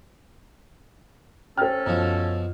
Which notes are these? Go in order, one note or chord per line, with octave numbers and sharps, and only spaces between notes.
C#4 A4 C5 G5 F6
F#2 B2 F3